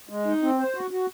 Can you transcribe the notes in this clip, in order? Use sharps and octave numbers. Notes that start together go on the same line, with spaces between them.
G#3
D#4
C4
C5
F#4
F#4